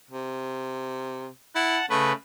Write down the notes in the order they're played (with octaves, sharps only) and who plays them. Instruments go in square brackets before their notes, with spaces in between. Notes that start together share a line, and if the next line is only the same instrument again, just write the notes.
[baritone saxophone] C3
[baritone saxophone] E4 [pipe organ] F#5 A5
[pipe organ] C#3 B4 [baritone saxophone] A3